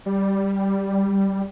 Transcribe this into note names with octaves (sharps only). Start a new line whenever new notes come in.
G3